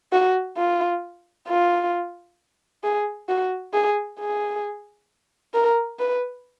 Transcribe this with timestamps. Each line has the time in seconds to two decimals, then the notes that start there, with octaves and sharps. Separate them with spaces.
0.13 F#4
0.57 F4
1.48 F4
2.83 G#4
3.29 F#4
3.74 G#4
4.19 G#4
5.54 A#4
5.99 B4